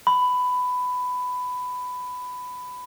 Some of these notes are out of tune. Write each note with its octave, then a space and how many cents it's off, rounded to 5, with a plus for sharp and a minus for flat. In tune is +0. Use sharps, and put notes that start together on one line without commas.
B5 +15